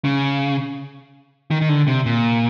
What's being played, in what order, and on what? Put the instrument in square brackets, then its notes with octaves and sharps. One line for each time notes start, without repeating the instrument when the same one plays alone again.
[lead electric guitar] C#3
D#3
D#3
D3
C3
A#2